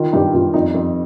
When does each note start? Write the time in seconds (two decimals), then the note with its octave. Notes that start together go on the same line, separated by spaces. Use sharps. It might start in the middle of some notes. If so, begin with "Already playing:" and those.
Already playing: D#3 F4
0.13 G2 D#4 G4
0.33 G2 F4
0.54 F2 D#4
0.74 F2